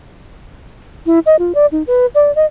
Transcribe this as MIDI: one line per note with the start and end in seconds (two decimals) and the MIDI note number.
1.06 1.19 64
1.26 1.36 75
1.39 1.53 65
1.55 1.66 74
1.72 1.83 63
1.87 2.06 71
2.15 2.34 74
2.35 2.46 75